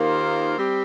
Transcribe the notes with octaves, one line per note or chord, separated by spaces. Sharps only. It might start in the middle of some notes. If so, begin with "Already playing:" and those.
Already playing: D#2 D#3 A#3 F4 C5
G3 C4 G4